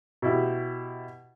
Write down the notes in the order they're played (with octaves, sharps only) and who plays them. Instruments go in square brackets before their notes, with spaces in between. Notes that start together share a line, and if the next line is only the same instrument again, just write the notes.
[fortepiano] B2 E4 G4